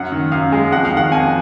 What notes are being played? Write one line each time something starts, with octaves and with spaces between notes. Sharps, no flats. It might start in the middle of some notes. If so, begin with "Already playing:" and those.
Already playing: F#2 F#5
D#3
F#2 F5
G#3
F2 F#5
F5
D#3
F#5
F2 G#5